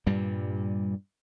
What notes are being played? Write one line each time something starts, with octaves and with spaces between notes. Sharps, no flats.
G2 A#2 G3